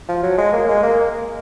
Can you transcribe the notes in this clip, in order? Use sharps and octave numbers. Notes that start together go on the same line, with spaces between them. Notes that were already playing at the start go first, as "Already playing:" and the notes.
F3
F#3
G#3
A#3
G#3
A#3